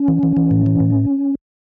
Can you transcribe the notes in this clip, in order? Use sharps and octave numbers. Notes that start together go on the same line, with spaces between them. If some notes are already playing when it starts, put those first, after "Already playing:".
Already playing: C#4
E3
E3
E3
A2
E3
A2